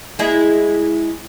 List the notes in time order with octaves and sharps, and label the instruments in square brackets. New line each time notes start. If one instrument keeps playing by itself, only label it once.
[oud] G#3 E4 G#4